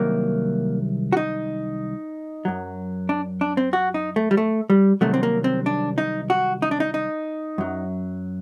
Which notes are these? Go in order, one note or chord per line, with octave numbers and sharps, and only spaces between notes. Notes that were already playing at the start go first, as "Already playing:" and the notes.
Already playing: C2 C3 D#3 F#3 A#3
F#4
D#4
F#2 F#3
D4
D4
C4
F#4
D#4
A3
G3
A3
G3
C2 C3 D#3 F#3 A3
C4
A#3
C4
D4
D#4
F#4
D#4
D4
D#4
D#4
F#2 F#3